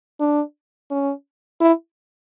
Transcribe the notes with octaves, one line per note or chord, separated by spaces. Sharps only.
D4
C#4
E4